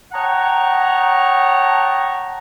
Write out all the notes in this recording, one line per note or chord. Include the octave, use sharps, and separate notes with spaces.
C#5 D#5 F#5 G5 A5 A#5